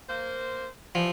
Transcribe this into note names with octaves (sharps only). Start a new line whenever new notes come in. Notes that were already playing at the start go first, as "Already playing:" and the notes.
A#3 C5
E3 F3 G3